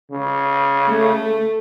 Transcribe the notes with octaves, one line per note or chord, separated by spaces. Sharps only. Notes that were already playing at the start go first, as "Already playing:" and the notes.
C#3
A3